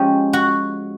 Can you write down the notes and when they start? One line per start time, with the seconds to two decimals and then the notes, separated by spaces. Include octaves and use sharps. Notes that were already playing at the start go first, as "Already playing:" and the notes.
Already playing: F3 G#3 C#4 G4
0.33 F#4